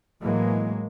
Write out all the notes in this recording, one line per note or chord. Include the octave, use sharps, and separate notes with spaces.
A2 E3 F#3 G#3 A#3